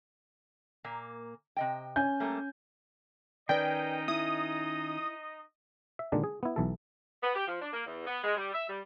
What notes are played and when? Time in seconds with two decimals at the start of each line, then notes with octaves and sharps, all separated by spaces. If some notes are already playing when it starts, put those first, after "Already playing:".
0.84 A#2 A#3
1.57 C3 D#5 G5
1.96 C#4 G#5 G6
2.20 G3 A3 A#3
3.49 D#3 C#4 D#4 B4 D5 D#5 G5
4.08 E4 D#6
5.99 E5
6.12 A#2 D3 D#3 G#3 D4
6.24 G#4
6.43 B3 E4
6.56 B1 E3 A4
7.23 B3
7.35 G4
7.48 F3
7.62 D4
7.73 A#3
7.86 E2
8.07 B3
8.24 G#3
8.36 G3
8.54 E5
8.69 G3